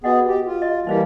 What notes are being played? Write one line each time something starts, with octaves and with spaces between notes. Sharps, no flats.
B3 F#4 G#4 D#5 F#5
G4
F4
D#5
E3 G3 A#3 D#4 C5 F5